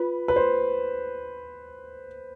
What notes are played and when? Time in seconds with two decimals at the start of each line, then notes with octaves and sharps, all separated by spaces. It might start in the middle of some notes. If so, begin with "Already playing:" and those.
Already playing: F4 B4
0.28 B4
0.36 C5